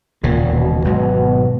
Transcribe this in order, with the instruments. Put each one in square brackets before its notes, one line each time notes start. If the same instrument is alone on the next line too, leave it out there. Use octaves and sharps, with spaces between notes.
[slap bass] E1 D#2 C#3 E3 [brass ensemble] A#2
[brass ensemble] B2
[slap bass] G#1 G#2 F#3 [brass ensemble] B2